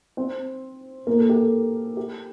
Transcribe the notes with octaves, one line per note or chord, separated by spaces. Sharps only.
C4 C5
A#3 A#4
A4
G4
A4
G4